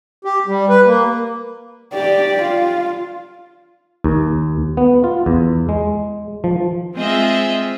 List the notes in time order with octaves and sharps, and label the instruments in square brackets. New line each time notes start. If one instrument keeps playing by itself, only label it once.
[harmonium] G4
G3
B4
A#3
[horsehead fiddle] G4 D5
F4
[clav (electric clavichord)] D#2
B3
F4
E2
G#3
F3
[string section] G#3 C4 F4 G#4 D#5 E5